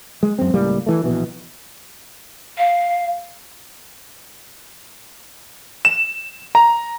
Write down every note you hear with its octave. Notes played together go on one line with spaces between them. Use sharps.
G#3
F#2 C4
C#2 A2 G3 A#3
E3 A3
A#1 B2 E3
F5
E7
A#5